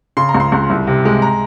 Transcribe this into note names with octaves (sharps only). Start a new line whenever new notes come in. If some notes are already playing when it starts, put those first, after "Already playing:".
C#3 C6
A#5
C#2
C6
C#2
C2
C3
G#3
A#5